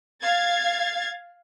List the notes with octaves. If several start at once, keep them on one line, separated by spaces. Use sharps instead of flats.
F5 G#6 A6